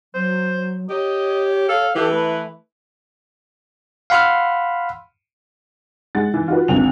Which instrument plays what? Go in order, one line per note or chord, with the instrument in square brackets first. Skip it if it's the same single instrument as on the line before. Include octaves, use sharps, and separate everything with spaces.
[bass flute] F#3 [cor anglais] C5
[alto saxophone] G4 [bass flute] C#5 [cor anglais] D#5
[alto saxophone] A4 [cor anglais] F5
[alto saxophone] E3 [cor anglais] G4 [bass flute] A4
[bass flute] A3 [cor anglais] B4
[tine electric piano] F5 F#5 B5 C6 E6 F6
[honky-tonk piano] G#3 F#5 A6
E3
F4 F#4 B4
G#1 D2 F7